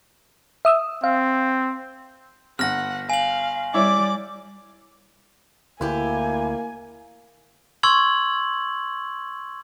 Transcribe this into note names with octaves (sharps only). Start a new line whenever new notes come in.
E5 D#6 E6
C4 F5
G1 F#5 F6 A#6
F5 G#5 F#7
G3 E4 C#5 D5 E5 D6
D2 A#3 E4 G4 G#5
C6 C#6 E6 G#6 F#7